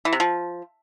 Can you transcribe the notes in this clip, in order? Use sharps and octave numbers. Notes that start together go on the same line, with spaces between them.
E3
C3
F3